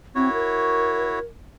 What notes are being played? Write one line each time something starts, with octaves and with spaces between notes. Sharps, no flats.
C4 E4 F#4 C#5
A#4